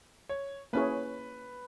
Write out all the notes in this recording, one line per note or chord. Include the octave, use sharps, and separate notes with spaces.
C#5
A#3 C#4 E4 G#4 B4 C#5